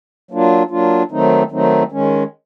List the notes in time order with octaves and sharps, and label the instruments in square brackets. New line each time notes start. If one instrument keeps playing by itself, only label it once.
[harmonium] F#3 A#3 D4 F4
F#3 A#3 D4 F4
D#3 F#3 A3 C4 D#4
D#3 F#3 A3 C4 D#4
D#3 G#3 C#4